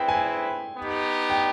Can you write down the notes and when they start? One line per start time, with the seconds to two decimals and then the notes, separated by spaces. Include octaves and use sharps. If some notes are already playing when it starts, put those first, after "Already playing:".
Already playing: C4 E4 G#4 B4 G5
0.08 G#5
0.77 B3 D#4 G4
1.30 G5